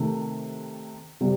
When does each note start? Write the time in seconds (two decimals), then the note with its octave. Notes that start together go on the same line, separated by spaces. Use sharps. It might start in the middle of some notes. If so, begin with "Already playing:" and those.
Already playing: C3 D#3 A3
1.21 C3 G3